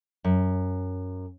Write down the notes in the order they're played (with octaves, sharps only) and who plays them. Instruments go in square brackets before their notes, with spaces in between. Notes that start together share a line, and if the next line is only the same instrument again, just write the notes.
[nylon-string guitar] F#2